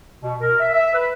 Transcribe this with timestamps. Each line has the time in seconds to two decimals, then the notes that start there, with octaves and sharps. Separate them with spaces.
0.22 B2
0.40 A#4
0.60 E5
0.73 E5
0.93 B4